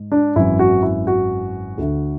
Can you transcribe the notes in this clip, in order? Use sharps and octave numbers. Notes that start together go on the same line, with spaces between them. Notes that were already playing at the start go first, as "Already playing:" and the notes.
Already playing: G#2
D4
G#1 F#2 E3 E4
F#4
E4
F#4
D2 D3 A3